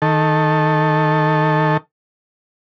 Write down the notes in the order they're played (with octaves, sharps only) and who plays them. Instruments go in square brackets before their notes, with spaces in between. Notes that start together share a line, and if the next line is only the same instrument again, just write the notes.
[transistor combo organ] D#3 A4